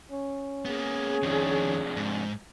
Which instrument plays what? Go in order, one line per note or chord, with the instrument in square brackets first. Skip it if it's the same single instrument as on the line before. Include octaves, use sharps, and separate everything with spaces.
[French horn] C#4
[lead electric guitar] A#3 B3 [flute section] G#4
[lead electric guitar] F2 D#3 [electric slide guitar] C3 F3 D4
[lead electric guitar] G#2